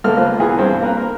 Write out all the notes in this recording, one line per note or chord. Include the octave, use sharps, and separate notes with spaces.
C#2 A3 A#3 F6
A#3 F4 B4 C5
E2 B3 G#4 D#6
G2 C4
A#3 A#4 B4
A#4